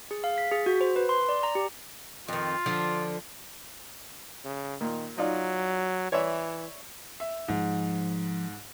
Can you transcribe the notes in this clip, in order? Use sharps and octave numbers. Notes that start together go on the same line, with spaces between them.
G#4
F5
B6
G#4
F#4
C5
B4
C6
D5
A#5
G4
F2 D#3 F4
D3 F3 D4
C#3
A#2 D#3
F#3 D#4 F4 D5
E3 C#5 D5 E5
E5
G#2 F3